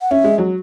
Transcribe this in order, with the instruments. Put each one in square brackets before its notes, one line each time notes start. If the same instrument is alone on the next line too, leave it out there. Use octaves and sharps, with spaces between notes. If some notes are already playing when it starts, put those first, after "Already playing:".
[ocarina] F#5
[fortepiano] C#4 [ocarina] E5
[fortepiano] G#3
F#3